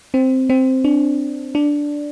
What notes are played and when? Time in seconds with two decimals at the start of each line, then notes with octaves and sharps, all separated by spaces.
0.14 C4
0.50 C4
0.84 D4
1.55 D4